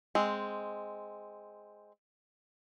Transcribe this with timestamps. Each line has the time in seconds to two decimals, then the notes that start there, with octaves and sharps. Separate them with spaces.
0.15 G#3 C4